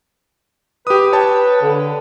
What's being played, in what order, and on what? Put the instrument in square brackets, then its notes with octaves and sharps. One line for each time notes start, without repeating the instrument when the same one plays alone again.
[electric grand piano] G4 D#6 [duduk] B4
[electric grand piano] C#5 G5 A5
[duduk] D3